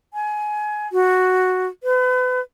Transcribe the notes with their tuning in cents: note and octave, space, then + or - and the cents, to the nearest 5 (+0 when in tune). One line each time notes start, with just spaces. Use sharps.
G#5 +20
F#4 -5
B4 +35